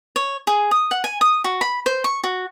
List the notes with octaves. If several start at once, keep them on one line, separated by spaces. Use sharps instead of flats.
C#5
G#4
D#6
F#5
G#5
D#6
F#4
B5
C5
C#6
F#4